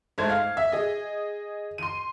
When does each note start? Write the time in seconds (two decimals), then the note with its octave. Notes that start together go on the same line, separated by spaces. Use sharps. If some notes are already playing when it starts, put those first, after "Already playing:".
0.18 G#2 A3 C5 G#6
0.29 F5
0.57 E5
0.72 G#4 D#5
1.78 C6 D#7